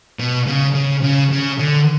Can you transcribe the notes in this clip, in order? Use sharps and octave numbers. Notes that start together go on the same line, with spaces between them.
B2
C#3
C#3
C#3
C#3
D3